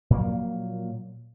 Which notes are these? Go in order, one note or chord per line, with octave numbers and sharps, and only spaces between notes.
A#2 F3 F#3 A#3